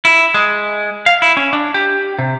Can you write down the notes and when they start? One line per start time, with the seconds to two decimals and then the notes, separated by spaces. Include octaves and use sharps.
0.05 E4
0.34 G#3
1.06 F5
1.22 E4
1.37 C#4
1.53 D4
1.74 G4
2.19 C3